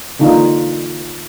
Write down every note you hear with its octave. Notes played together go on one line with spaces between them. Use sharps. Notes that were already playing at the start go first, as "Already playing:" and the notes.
D3 E3 A#3 D4 D#4 F4